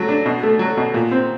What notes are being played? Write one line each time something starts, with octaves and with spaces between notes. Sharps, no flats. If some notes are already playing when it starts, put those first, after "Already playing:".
Already playing: F#3 A3
D4
B2
A3
F#3
B2
A#2
C4